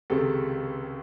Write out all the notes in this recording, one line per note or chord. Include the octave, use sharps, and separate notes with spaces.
C#2 C3 D#3 G#3 A4